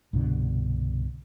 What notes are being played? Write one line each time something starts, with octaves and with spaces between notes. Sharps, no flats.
C2 G2 B2 D3